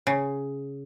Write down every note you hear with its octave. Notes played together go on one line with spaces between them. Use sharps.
C#3